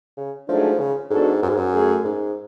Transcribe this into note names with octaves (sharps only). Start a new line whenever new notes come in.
C#3
G#2 F3 F#3 A3 D4 G#4
C#3
G#2 G#3 B3 D4 F#4 A4
F#2
G#2
F#2
F#3 A3 C#4 G#4
G#2